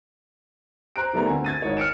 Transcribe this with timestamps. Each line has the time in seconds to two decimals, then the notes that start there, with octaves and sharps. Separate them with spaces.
0.96 C5 A#5 F#6 D7
1.13 D#3 G3 A3 B3 A#5
1.26 D2 C4 G#5
1.44 G#6 A6 D#7
1.62 G#1 D#4 C#5
1.77 F6 C#7 D7 E7